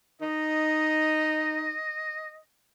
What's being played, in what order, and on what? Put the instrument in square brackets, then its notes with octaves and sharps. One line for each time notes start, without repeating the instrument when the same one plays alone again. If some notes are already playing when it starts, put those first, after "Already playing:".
[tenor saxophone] D#4 [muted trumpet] D#5